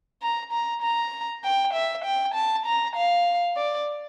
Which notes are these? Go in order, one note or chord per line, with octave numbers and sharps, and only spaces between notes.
A#5
A#5
A#5
G5
E5
G5
A5
A#5
F5
D5